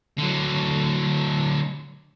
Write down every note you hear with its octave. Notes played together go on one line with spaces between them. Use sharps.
D3 F#3